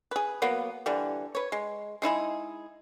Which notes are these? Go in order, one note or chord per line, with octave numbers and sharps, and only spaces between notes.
G#4 B4
F#3 A#3 B3
D3 E3 G3
B4 C#5
G#3
G#3 D#4 E4 G#4